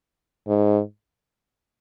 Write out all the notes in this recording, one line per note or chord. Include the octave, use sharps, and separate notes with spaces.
G#2